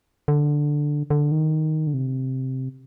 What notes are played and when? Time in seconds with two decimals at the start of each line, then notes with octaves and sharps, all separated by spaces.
0.28 D3
1.10 D3
1.32 D#3
1.87 D3
1.94 C3